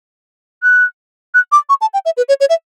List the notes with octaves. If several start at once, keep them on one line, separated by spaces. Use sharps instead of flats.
F#6
F#6
D6
C#6
A5
G5
E5
B4
C#5
C#5
E5